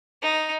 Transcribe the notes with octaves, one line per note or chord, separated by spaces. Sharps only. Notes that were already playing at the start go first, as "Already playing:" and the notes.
D#4